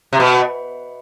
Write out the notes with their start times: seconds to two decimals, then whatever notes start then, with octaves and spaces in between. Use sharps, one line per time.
0.13 C3
0.20 B2